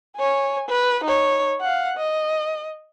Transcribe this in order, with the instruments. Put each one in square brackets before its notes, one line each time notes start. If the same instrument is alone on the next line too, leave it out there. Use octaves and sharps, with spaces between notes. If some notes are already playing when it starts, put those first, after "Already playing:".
[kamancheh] C#5 G#5
B4
D#4 C#5
F5 F#5
D#5